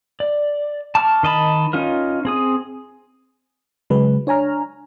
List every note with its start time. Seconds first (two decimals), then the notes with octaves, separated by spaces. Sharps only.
0.20 D5
0.95 A5 C#6 D6 F6
1.23 D#3 D#5 A5 B5
1.73 C#4 D#4 F4 A#4
2.25 C4 G#4 D#6
3.90 C#3 F#3 G#3 B4
4.27 D4 C#5 G#5 A#5 F6